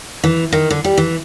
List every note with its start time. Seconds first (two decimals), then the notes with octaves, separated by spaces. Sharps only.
0.24 E3
0.52 D#3
0.70 D3
0.84 G3
0.98 E3